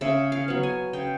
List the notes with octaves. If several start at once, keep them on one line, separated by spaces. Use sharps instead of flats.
C#3 E5
F5
F#3 B3
G#5
C#3 G5